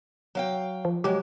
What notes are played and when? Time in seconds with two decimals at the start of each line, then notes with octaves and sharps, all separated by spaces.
0.35 F#3 F5 G5
0.85 F3
1.04 F#3 G#3 G4